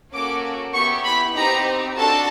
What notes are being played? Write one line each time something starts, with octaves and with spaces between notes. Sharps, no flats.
A#3 C#4 F#4 A4 D6
B3 E4 G4 C#6
B5
C4 D#4 G4 A#5
D4 F#4 A4 A5